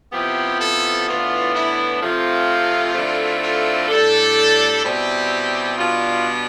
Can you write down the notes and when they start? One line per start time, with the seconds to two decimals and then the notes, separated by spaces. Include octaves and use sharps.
0.12 C3 F3 B3 E4 G4
0.59 A4
1.07 A2 E3 B3 D4 F4
1.53 E4
2.01 C3 F3 A3 C4 F4
2.95 D3 A3 C4 E4
3.43 F4
3.89 A2 G3 D4 A4
4.83 B2 G3 C4 E4 G4
5.77 B2 G3 D4 F4